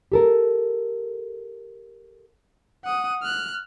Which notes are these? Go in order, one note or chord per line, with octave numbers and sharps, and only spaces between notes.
G4 A4 A#4
F#5 D#6
F6 F#6